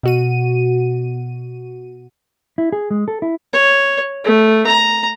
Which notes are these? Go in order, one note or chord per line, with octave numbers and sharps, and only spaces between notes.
B2 F#4 D#7
E4
G#4
G#3
A4
E4
C#5
A3
A#5